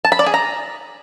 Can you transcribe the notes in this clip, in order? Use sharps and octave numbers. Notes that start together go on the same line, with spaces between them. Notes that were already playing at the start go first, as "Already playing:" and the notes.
A5
B5
D5
G#4
A#5